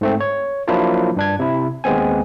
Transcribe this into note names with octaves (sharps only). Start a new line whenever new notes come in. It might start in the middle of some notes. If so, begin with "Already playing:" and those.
G#2 A3 C4
C#5
F3 F#3 A#3 D4 E4 F4
G2 D4 G#6
C3 E4
D#2 G#3 B3 C4 G#5